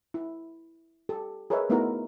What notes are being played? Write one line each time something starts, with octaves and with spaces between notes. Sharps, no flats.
E4
G4 A4
G#4 A#4 B4 C#5 D#5 E5
A3 B3 D#4 E4 F#4 A#4